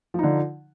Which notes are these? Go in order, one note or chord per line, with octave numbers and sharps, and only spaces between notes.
D3 F3 D#4